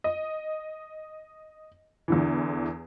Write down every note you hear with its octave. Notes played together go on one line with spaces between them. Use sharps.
D#5
E2 D3 E3